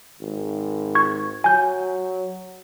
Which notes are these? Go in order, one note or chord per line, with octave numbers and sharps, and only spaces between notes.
G#1
C#6 G#6
F#3 G#5 G6